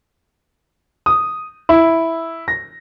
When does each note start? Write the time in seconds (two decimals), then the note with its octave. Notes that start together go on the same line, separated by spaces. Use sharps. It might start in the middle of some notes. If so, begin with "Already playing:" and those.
1.06 D#6
1.69 E4
2.48 A#6